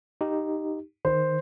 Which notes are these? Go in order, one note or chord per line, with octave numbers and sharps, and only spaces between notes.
D#4 G4
D#3 C5